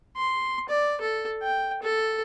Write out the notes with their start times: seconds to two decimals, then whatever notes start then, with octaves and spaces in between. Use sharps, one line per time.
0.16 C6
0.69 D5
1.01 A4
1.43 G5
1.83 A4